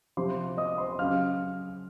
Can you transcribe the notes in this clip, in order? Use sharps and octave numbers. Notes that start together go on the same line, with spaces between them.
C3 F3 C5 C6
D#5 D#6
C5 C6
C#3 F#3 F5 F6